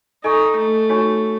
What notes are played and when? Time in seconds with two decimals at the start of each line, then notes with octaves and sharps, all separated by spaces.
0.24 D#4 A4 D#5 G#5 C#6
0.57 A3
0.89 D#4 F#4 C#5 G#5 C#6